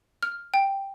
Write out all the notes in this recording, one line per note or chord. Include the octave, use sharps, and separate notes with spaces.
F6
G5